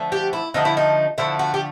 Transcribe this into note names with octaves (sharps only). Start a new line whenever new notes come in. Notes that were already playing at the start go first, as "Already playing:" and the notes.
Already playing: D3 F3 A3
G4
E4
D3 F3 A3 D#4
E4
D#4
D3 F3 A3 E4
F#4
G4